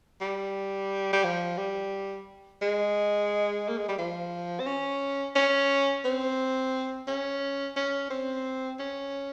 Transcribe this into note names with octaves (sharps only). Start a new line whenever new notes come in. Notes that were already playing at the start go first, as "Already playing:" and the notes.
G3
G3
F3
G3
G#3
A#3
G#3
G3
F3
C4
C#4
C#4
C4
C#4
C#4
C4
C#4